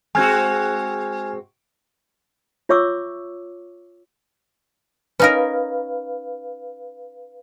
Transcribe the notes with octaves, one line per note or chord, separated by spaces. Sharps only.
G#3 C4 F#4 G#5 F6 G#6
F4 C#5 E5 C#6 D6 E6
C#4 D#4 A#4 B4 F5